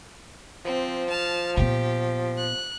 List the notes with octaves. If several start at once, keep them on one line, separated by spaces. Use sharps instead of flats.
F3 C4
A5 F6
A#2 B3 G4
F#6